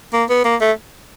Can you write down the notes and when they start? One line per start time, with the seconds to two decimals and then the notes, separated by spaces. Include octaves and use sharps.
0.13 A#3
0.30 B3
0.45 A#3
0.61 A3